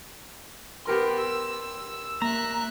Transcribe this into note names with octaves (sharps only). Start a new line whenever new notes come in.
B3 G4 A#4 B4 C6
E6
A#3 E5 A#5 F#6